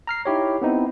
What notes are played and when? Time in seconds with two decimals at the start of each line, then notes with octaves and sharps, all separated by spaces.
0.07 A#5 F6 C7
0.25 D#4 E4 G4 C#5
0.62 B3 C4 D#4 E4